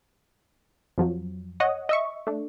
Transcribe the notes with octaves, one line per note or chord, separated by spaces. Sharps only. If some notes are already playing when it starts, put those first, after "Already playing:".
F2 F3 F#3
C#5 D#5 F#5 D#6
D#5 E5 C#6
A3 D4